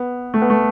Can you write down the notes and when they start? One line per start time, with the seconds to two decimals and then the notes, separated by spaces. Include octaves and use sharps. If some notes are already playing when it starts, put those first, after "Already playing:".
Already playing: B3
0.34 A3
0.42 B3
0.50 A3